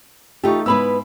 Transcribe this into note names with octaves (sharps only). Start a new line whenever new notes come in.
A3 D#4 F4 G4 C#6
G#2 B3 E4 B4 B5 E6